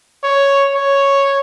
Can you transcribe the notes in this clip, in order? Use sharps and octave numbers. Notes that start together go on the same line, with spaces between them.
C#5
C#5